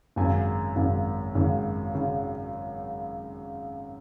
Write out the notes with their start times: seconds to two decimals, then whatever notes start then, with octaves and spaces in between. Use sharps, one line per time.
0.16 G#1 F#2 C#3 G#5
0.76 G#1 F#2 C#3
1.35 G#1 F#2 C#3
1.95 C#3